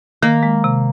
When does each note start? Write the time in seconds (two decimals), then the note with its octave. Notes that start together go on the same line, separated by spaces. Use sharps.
0.23 D#3 A#3
0.43 G#3
0.64 C3